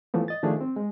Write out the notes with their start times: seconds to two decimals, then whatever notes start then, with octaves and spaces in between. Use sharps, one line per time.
0.14 E3 F3 A3 B3
0.28 D#5 A6
0.43 D#3 F3 A3 D4 G#4
0.60 C4
0.76 G#3